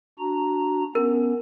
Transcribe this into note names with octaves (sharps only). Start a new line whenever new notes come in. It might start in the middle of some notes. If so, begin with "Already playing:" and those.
D4 F#4 A#5
B3 C#4 A#4